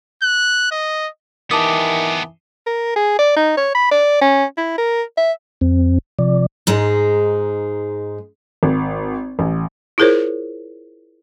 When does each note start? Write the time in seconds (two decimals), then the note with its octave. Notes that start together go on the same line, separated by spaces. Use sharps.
0.23 F#6
0.71 D#5
1.51 D#3 E3 B3 G4 A5 D6 D#6
2.66 A#4
2.96 G#4
3.19 D5
3.36 D#4
3.57 C#5
3.75 B5
3.91 D5
4.22 C#4
4.58 E4
4.78 A#4
5.17 E5
5.61 F2 C4
6.19 C3 F3 D5
6.67 G#2 G#3 D#4
8.63 G#1
9.39 A1
9.98 E4 F4 G#4 A#4 C5 C#5